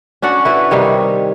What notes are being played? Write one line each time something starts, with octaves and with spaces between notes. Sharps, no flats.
C#4 D4 F#4 F#5
E4 F#4 B4
C3 D#3 G3 C#5